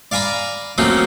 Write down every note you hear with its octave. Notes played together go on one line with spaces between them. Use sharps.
D5 F5 G#5 A#5 B5
F3 F#3 A3 A#3 C4 C#4